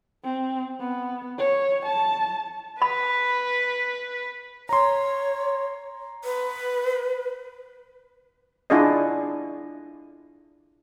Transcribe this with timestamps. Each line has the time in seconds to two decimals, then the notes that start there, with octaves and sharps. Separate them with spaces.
0.24 C4
0.80 B3
1.39 C#5
1.85 A5
2.82 B4 B5
4.69 C#5 A#5 C6
6.24 B4
8.70 D4 E4 F4 G#4 D5 D#5